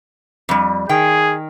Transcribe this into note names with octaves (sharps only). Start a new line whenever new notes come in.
F2 G3
D#3 G#4 G5